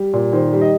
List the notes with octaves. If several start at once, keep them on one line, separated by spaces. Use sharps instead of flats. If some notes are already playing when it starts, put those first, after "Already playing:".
Already playing: G3
A#2
D#3 C5
G3
D#5